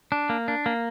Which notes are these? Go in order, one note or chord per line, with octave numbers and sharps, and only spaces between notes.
D4
A#3
D4
A#3